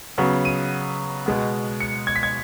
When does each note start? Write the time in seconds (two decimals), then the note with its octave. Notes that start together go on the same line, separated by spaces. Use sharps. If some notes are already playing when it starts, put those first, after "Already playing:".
0.18 C#3 F#3 B3
0.45 D#7
1.26 B2 G#3 B3
1.80 C#7
2.07 G#6
2.16 B6
2.23 G#6